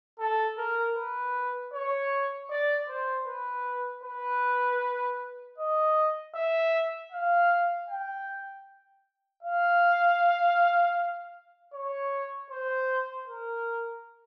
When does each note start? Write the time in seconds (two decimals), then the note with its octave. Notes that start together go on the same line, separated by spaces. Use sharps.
0.19 A4
0.57 A#4
0.96 B4
1.73 C#5
2.50 D5
2.89 C5
3.27 B4
4.04 B4
5.58 D#5
6.35 E5
7.12 F5
7.89 G5
9.43 F5
11.73 C#5
12.50 C5
13.27 A#4